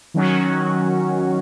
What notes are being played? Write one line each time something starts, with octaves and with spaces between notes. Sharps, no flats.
D#3 F#3 C#4 F#4